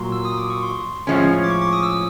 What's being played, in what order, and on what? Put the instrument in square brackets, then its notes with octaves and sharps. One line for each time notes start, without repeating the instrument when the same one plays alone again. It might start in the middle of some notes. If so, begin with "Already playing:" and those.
Already playing: [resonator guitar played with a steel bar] A#2 F#3 [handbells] C6
[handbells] E6
D#6
D6
C#6
C6
[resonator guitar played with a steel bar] A2 F3 G#3 C#4
[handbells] D6
C#6
D6
D#6
E6